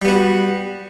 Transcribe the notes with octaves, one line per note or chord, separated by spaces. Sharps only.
G3 B3 F#4